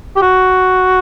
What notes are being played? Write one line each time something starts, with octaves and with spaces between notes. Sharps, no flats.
G4
F#4